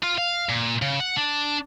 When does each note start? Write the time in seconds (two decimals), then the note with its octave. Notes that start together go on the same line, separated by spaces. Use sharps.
0.03 F4
0.18 F5
0.49 A#2
0.82 C#3
1.00 F#5
1.17 D4